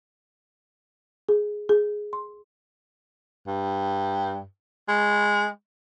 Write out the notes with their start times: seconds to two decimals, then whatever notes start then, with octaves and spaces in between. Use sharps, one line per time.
1.29 G#4
1.69 G#4
2.13 C6
3.47 G2
4.88 G#3